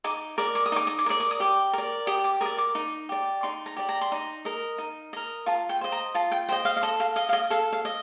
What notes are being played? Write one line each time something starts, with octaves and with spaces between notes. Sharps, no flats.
D#4 D6
A#4 D5 D6
D6
D#6
D#4 D6
D#6
D6
A#4 D5 D#6
D6
D#6
G4 D6
A#4 D5
G4 D#6
D6
A#4 D5 D#6
D6
D#4
G4 D5
D#4 C6
A#5
G4 D5
A#5
C6
D#4 A#5
A#4 D#5
D#4
A#4 D#5
F4 A5
G5
C5 D#5
A#5
F4 A5
G5
C5 D#5 G5
F5
F5
A4 D#5
F5
D#5 F5
F5
D#5
A4 F5
F5
D#5